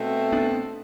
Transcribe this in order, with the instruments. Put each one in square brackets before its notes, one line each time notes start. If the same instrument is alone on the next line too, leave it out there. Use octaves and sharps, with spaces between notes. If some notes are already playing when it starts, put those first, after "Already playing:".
Already playing: [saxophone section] B2 A3 C4
[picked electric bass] B3 D4